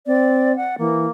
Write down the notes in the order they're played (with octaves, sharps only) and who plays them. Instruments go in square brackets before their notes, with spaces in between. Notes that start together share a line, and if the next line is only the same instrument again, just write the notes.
[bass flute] C4 [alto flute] D5
[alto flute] F#5
[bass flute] E3 [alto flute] A#3